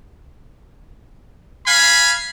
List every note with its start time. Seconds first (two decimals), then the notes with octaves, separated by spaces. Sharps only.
1.67 F5 G#5 B5